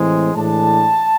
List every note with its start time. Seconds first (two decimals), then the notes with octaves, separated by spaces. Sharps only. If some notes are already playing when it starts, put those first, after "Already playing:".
Already playing: A2 E3 G#3 C4
0.36 A2 E3 G#3 D4 A5